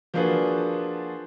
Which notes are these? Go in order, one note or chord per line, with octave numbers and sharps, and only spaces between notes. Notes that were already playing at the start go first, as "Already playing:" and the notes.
F3 A#3 D4 F#4 G#4 B4